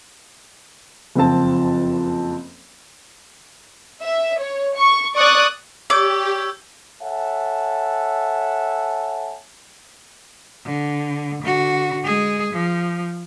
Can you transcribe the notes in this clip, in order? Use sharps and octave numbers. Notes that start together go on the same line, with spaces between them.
F#1 F2 F3 C4 A5
E5
C#5
C#6
D5 C#6 D#6 F#6
G4 C#5 D5 D6 E6 G6
A4 C#5 E5 F#5 G#5 A5
D3
D3 F#4
G#3 G#4
F3